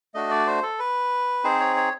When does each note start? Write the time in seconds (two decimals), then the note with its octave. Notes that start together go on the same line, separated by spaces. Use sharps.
0.14 A3 D4 F#4 D#5
0.31 D5
0.47 C5
0.63 A4
0.79 B4
1.44 C4 D#4 G#4 C5
1.60 C#5
1.76 C#5